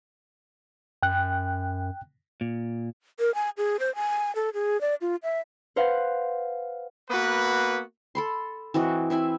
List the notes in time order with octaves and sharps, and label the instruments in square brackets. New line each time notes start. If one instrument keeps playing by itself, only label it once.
[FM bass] F#2 [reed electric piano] G5 F#6
[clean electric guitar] A#2
[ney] A#4
G#5
G#4
C5
G#5
A4
G#4
D5
F4
E5
[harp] B4 C5 F5 F#5
[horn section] A#3 B3 F#4 B4
[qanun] A4 B5 C6
E3 C4 F#4 D#5
C4 E4 E5 G#5